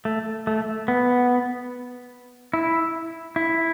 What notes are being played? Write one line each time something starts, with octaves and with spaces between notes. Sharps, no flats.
A3
A3
B3
E4
E4